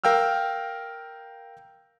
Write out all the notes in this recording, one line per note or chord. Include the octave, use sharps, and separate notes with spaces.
A#4 F5 G5 E6 F6